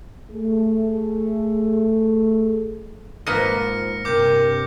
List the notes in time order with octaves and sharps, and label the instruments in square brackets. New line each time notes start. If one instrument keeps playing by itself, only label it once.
[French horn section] A3 G#4
[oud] G#2 F3 [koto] A#3 B4 D#5 [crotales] F6 A#6 C#7
[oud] G2 C3 [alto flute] A#4 [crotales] D6 G6